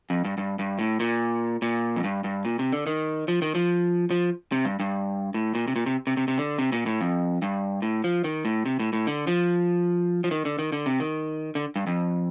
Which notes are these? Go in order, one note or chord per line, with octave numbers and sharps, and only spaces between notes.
F2
G2
G2
G2
A2
A#2
A#2
F2
G2
G2
A#2
C3
D3
D#3
F3
D#3
F3
F3
C3
G2
G2
A2
A#2
C3
A#2
C3
C3
C3
C3
D3
C3
A#2
A2
F2
G2
A2
F3
D#3
A2
C3
A2
A2
D3
F3
F3
D#3
D3
D#3
D3
C3
D#3
D3
G2
F2